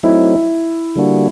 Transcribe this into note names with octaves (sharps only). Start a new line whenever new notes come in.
F#3 A3 C4 D#4 E4
D3 G3 A#3 D4 F#4